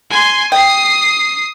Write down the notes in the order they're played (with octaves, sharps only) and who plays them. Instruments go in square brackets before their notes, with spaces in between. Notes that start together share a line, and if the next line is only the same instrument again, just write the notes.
[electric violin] G#5 C6
[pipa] G5 [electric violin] D#6 C7